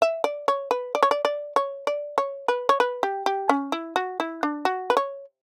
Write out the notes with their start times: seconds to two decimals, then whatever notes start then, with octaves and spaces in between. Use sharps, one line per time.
0.02 E5
0.24 D5
0.48 C#5
0.71 B4
0.95 D5
1.03 C#5
1.11 D5
1.25 D5
1.56 C#5
1.87 D5
2.18 C#5
2.48 B4
2.69 C#5
2.80 B4
3.03 G4
3.26 G4
3.49 C#4
3.72 E4
3.96 F#4
4.20 E4
4.43 D4
4.65 F#4
4.90 B4
4.97 C#5